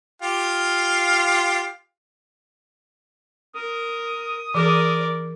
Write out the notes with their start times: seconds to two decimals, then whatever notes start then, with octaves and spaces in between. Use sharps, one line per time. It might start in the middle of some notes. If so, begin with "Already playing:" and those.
0.22 F4 G4 F5
3.56 A#4 D#6
4.54 E3 G#4 A#4 D5